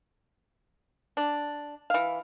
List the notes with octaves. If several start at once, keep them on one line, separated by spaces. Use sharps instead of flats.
D4
E3 F5